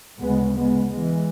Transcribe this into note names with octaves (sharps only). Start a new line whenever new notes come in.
D2 C#3 G#3 B3
G#3 B3
E3 G#3